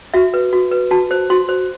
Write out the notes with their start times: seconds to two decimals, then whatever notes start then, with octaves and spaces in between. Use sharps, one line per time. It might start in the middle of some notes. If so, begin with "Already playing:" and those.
0.14 F#4 E5
0.34 B4
0.53 F#4
0.71 B4
0.91 F#4 A5
1.11 C5
1.30 F#4 C6
1.49 C5